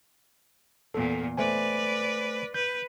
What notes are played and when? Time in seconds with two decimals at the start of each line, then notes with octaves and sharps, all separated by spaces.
0.94 E2 A#2 A4
1.38 A3 B4 C5 D5 G#5
2.54 B4 G6